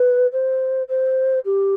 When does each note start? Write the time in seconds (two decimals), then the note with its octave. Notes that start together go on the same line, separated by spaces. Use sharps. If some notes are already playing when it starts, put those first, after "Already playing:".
Already playing: B4
0.32 C5
0.88 C5
1.45 G4